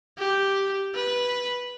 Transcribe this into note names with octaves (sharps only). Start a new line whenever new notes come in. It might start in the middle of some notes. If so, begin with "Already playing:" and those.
G4
B4